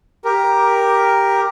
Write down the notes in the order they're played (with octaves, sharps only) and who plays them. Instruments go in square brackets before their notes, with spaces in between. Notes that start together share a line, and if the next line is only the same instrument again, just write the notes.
[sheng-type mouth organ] G4 A#4